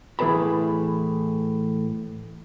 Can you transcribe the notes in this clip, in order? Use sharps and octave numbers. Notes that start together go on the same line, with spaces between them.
A2 E3 G#4 B4 A5 B5